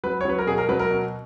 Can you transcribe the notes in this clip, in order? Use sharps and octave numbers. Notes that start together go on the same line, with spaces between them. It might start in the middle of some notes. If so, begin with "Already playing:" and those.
F#3 B4
C#5
F#3 B4
A#4
B2 G#4
A#4
F#3 B4
A#4
B2